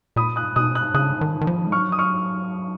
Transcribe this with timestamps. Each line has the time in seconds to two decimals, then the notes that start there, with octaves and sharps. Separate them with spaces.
0.16 A#2 B5 D#6
0.36 D#6 F#6
0.56 B2 D#6 F#6
0.75 D#6 F#6
0.94 C#3 D#6 F#6
1.21 D#3
1.41 D#3
1.47 F3
1.67 G#3
1.72 F#3 C#6 F6
1.92 D#6
1.99 C#6 F6